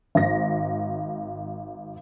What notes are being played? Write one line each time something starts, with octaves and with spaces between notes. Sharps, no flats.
G#1 A#6